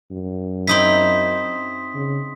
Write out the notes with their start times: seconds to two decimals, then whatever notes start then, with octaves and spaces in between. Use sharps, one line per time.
0.11 F#2
0.67 C4 D#4 E4 C6 D#6 B6
1.95 C#3